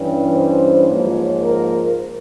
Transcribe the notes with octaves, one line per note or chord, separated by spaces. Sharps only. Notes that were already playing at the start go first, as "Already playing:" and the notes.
Already playing: G2 E3 G3 C#4
C5
G#2 F3 A#3 C#5
A#4